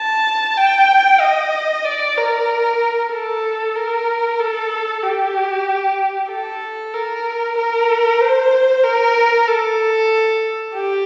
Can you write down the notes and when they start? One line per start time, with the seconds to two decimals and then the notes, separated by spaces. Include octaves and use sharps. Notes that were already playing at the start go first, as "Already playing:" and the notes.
Already playing: A5
0.57 G5
1.20 D#5
1.85 D5
2.17 A#4
3.12 A4
3.76 A#4
4.40 A4
5.03 G4
6.30 A4
6.94 A#4
7.58 A#4
8.21 C5
8.84 A#4
9.47 A4
10.75 G4